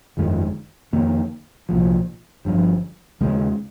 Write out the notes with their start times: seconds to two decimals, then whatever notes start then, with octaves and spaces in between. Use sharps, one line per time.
0.17 G1 F2 D#3 G#3
0.93 F2 D#3 A#3
1.69 C2 A#2 F3
2.45 G1 G2 F3
3.21 D#2 C#3 G#3